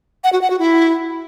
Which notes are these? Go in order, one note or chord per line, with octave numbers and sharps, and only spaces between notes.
F#5
F#4
F#5
F#4
E4